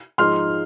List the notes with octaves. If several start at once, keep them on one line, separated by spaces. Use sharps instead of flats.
G#2 F3 G#3 D#4 C6 F6